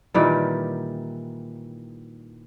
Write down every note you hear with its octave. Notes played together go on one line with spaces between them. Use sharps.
A#2 D#3 E3 G3